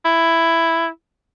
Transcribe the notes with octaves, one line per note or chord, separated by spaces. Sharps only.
E4